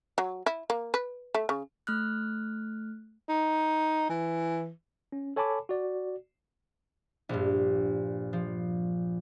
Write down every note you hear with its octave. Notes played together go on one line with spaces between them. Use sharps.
F#3
E4
A#3
B4
A3
C#3
A3 F6 F#6
D#4
E3
C#4
A4 C#5 G#5 A5 B5 D6
F#4 D5
A#1 G2
F3